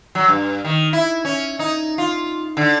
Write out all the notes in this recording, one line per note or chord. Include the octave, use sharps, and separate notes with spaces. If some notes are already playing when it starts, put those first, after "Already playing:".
F#3
G2
D#3
E4
C#4
D#4
F4
D3